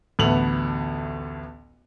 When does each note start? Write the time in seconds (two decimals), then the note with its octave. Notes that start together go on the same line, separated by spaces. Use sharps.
0.19 A1 D2 A3 B3 F7 F#7